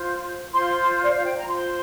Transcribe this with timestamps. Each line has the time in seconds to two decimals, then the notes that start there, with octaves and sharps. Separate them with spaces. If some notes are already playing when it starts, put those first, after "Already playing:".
Already playing: F4 C5
0.53 F4 C5 C6
1.02 D5
1.14 F5
1.24 G5
1.36 A#5
1.47 F4 C5 C6